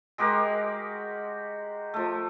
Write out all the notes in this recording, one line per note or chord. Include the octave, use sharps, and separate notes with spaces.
G#3 F#4 G4 A#4
F3 A3